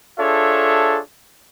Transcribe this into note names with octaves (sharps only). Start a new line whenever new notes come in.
D4 F4 G#4 A4 C#5 E5